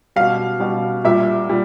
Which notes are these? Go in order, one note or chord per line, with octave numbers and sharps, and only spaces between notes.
B2 G3 F5
B2 G3
A#2 G3 E5
A#2 G3